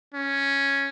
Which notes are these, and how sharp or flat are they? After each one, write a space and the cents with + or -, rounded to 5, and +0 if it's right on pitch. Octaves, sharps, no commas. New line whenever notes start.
C#4 +0